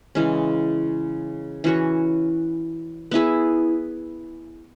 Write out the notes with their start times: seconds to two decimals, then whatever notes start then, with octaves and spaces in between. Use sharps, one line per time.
0.15 C#3 E3 G#3 C#4
1.64 E3 C#4 F#4 C#5
3.11 B3 E4 G#4 E5